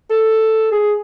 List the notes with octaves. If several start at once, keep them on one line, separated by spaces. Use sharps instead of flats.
A4
G#4